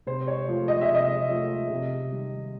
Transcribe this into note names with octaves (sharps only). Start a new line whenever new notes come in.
C3 C5
C#5
F3 A3
D#5
E5
C3
D#5
F3 A3
C3
D#3 G3